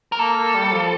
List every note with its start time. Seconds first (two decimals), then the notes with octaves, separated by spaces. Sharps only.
0.12 A#4
0.19 A#3 A4
0.37 A#3
0.54 G3
0.72 F3